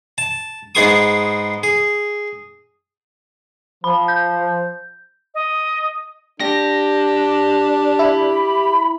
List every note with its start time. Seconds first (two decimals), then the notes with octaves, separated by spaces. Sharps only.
0.18 A5
0.75 G#2 B3 G#4 C6 C#6 D#6
1.63 G#4
3.84 F3 B5
4.08 G6
5.34 D#5
6.40 D4 G4 A#6
7.99 E4 B5